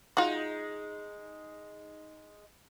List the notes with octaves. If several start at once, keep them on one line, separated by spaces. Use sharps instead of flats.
G#3 D#4 F4 F#4